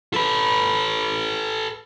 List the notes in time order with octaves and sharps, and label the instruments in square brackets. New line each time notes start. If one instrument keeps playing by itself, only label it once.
[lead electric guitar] A4 B4